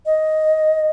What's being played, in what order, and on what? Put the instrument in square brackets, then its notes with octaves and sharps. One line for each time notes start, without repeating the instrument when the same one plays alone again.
[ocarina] D#5